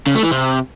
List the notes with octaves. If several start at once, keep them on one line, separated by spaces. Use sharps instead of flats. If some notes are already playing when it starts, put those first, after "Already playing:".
C#3
A3
E3
C3